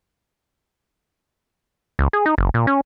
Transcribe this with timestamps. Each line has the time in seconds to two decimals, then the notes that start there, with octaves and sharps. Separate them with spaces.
1.99 C#2
2.13 G#4
2.26 D#4
2.38 F#1
2.54 A#2
2.67 C#4